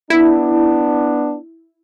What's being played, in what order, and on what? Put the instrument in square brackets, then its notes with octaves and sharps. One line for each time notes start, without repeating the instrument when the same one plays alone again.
[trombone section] B3 D4 [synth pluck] E4